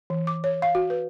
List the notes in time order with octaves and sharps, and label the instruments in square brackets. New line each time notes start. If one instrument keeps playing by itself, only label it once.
[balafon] E3
D6
C#5
F5
F#4
B4